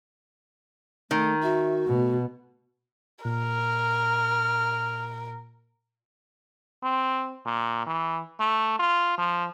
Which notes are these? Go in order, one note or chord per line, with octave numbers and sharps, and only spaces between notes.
D#3 A3
F#4 E5
B2 A3
A#2 A#4 F6
C4
A#2
E3
A3
F4
F3